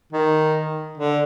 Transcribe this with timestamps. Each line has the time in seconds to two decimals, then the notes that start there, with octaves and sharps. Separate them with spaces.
0.13 D#3
0.97 D3